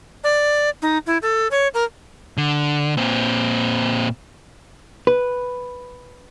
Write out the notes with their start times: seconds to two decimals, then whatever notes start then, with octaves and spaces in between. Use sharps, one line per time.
0.24 D5
0.82 D#4
1.06 E4
1.22 A4
1.51 C#5
1.74 A#4
2.37 D3
2.97 A#2 C4
5.07 B4